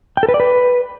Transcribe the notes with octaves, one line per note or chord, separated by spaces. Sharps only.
G5
A4
B4
D5
B4